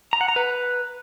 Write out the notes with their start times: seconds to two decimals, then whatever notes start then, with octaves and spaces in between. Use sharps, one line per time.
0.13 A#5
0.21 F#5
0.28 A#5
0.36 B4